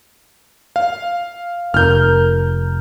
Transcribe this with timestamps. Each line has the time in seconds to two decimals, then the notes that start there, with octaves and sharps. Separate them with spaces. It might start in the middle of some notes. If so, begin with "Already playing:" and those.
0.76 F5
1.74 F1 A#4 F6 G6